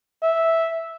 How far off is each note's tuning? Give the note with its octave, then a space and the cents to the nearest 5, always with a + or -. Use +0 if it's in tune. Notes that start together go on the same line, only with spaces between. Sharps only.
E5 -5